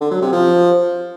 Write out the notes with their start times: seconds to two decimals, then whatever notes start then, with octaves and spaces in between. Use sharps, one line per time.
0.01 D3
0.11 F#3
0.22 C3
0.32 F3